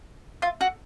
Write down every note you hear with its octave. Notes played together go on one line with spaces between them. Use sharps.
F4
F#4